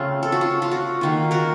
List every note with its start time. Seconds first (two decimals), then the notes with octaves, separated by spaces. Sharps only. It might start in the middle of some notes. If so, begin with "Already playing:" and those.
Already playing: C#3 A3 C4 F4
0.23 A4
0.32 F#4
0.41 F4
0.62 F4
0.71 F#4
1.01 D#3 A#3 F4
1.31 F#4 A#4